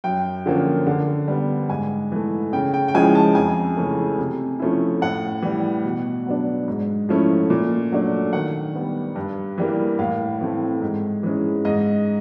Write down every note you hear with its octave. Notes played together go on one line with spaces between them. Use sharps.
F#2 G5
D3 F3 A#3 C#4
D3
G3 B3
G#2 G#5
E3 A3
C#3 G5
G5
G5
F3 G#3 C#4 E4 G#5
A5
F2 G#5
C#3 E3 A3 C#4
C3
F3 A3 C#4 E4
A2 F#5
E3 G3
B2
F#3 B3 D4
G#2
F3 A3 C#4 E4
A#2
F#3 A3 D4
D#3 F#5
G3 B3
G2
E3 G3 A#3
A2 F5
E3 A3 C4
G#2
E3 G#3 C#4
G#2 D#5